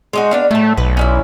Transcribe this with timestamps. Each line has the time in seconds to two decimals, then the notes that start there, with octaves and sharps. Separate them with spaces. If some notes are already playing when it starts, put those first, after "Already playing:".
0.13 G#3 D#4 F#4
0.31 B3 D4 F5
0.51 A2 A3 A5
0.77 B1 B4
0.97 C#4 D#4 E4